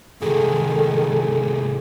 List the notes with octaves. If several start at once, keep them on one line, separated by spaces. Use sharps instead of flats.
C2 G#2 D#3 G#4 A4